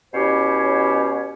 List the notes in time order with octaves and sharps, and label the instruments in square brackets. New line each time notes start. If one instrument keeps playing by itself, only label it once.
[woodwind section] B2 C#4 E4 G4 C5 C#5